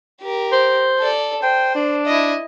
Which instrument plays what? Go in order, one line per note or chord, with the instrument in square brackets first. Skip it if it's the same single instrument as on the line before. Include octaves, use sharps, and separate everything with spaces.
[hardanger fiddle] G4 A#4
[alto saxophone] C5
[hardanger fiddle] A4 D5
[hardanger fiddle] C5 [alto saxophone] G5
[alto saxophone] D4
[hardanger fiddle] E4 D#5